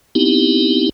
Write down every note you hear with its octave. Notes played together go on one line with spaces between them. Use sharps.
B3 C4 D#4 E4 G4